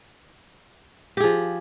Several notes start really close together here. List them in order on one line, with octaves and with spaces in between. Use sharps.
G4 G#4 F3